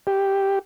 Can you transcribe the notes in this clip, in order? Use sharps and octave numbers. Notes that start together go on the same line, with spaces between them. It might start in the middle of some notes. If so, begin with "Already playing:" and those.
G4